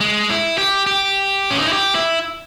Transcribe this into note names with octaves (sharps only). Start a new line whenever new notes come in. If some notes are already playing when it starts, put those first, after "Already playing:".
G#3
E4
G4
G4
C#4
D#4
E4
G4
E4